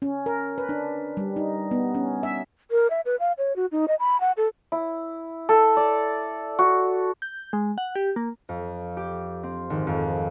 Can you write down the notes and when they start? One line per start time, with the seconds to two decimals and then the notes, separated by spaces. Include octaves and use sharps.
0.02 C#4
0.26 A#4
0.58 B4
0.69 D4
1.17 G3
1.36 D#4
1.71 B3
1.95 C#4
2.23 E5
2.71 A#4
2.90 E5
3.05 B4
3.20 F5
3.38 C#5
3.56 F#4
3.72 D#4
3.88 D#5
3.99 B5
4.20 F#5
4.37 A4
4.72 E4
5.49 A4
5.77 D5
6.59 F#4
7.22 G6
7.53 G#3
7.78 F#5
7.96 G4
8.16 A#3
8.49 F2
8.97 G4
9.43 C4
9.70 G#1
9.87 F2